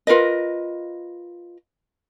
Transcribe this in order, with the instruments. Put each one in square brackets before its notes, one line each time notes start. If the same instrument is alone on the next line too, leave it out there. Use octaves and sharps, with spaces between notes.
[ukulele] F4 A#4 B4 D#5